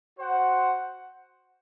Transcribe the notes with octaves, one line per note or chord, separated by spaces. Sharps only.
F#4 C5 F#5